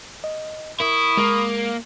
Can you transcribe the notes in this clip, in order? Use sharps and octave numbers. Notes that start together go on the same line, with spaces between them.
D#5
E4 A#4 B5 C#6 D#6
G#3 A#3